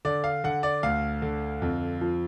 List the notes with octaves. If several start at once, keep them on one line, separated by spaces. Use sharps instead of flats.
D3 D5
F5
D3 F#5
D5
D2 F5
D3
F2
F3